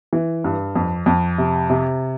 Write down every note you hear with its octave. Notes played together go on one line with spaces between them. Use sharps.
E3
G2
F2
F2
C3
C3